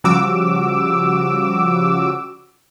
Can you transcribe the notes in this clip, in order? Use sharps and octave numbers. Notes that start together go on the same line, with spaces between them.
C#3 F3 G3 F#4 D6 E6